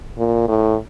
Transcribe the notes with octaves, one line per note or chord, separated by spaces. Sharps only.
A#2
A2